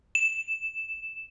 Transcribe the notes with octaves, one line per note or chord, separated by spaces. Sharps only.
E7